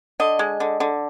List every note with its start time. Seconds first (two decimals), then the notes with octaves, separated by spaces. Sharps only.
0.20 D3 D#5
0.39 G#3
0.60 D3
0.80 D3